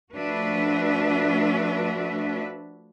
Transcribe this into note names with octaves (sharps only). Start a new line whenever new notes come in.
F3 A3 D4 F#4 B4 E5